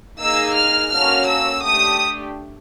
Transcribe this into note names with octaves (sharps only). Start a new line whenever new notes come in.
A#3 D#4 G#4 E6
F6
A#3 C#4 F#4 A4 F6
E6
A3 D4 G4 D#6